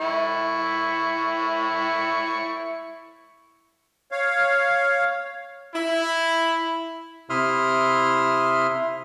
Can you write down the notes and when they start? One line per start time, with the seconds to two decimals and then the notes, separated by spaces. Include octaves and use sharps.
0.01 E4 C#6
4.11 C#5 F5
5.73 E4
7.30 C3 E4 E5 C6 D#6 F6